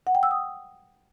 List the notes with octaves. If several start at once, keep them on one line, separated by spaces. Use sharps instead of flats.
F#5
G5
E6
D#6